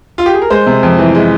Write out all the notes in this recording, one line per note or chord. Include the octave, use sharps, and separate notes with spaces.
F4
G4
G#4
A#4
G#3 C5
C3
F2
E3
G#3